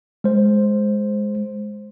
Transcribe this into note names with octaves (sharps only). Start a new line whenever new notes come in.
G#3 C5